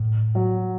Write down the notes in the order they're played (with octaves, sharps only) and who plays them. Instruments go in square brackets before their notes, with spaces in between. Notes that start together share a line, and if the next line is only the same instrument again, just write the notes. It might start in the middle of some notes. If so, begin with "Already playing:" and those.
Already playing: [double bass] A2
[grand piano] F#3